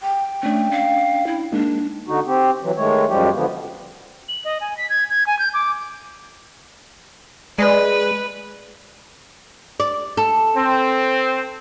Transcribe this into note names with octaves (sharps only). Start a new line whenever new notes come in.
G5
A3 C#4 D4
F5
E4
G#3 A#3 D4 D#4
D3 D#4 F#4
C4 G4
E3 F#3
D#3 G#3 A3 C#5
F#2 F3 G3 G#3 G4
D3 F3 B3
F#7
D#5
G#5
B6
G#6
G#6
G#5
G6
D6
G#3 B4 D5
D5
A4
C4